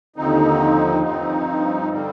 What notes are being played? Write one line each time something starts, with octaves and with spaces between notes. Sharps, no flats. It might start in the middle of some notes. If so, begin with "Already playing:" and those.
D#2 D3 F3 C4 D#4
G2 F3 C4 D#4
D3 G3 C4